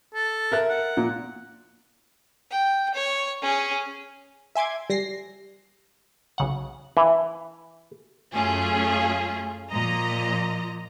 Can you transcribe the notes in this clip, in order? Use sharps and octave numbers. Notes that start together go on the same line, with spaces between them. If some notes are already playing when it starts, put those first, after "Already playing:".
A4
A#4 E5 F#6
F#5
A#2
G5
C#5
C#4 G#4
E5 G#5 C6 D6 G#6
G3 A#6 C7
B1 C#3 F#5
E3
F#2 A3 C#4 F4 G#4
A#2 F3 D#5 A#5